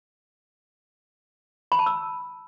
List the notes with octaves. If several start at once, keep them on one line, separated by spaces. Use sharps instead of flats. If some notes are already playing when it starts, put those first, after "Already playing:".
B5
A5
E6